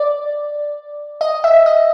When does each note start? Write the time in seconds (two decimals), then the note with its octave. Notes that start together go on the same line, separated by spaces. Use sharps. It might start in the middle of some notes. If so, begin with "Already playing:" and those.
Already playing: D5
1.21 D#5
1.44 E5
1.66 D#5